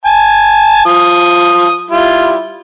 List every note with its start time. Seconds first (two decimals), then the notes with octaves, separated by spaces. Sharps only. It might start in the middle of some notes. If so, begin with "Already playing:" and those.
0.06 G#5 A5
0.86 F3 D#6
1.91 G3 E4 F4